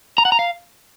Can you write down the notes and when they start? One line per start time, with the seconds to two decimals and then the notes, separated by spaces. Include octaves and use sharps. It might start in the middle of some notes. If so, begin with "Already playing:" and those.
0.18 A#5
0.25 F#5
0.32 A#5
0.39 F5